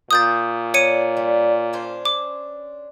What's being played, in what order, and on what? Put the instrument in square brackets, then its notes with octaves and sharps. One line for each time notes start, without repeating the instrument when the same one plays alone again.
[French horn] A#2 [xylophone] D#6 G6 A6
[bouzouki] D4 [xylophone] C#5 C#7 D#7
[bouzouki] G3
C#4 D4 C5
[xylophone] D6